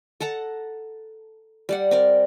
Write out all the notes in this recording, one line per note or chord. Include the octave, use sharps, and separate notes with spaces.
A4 F#5 A5 A#5
G3 D5 F#5
C4 A#4 D5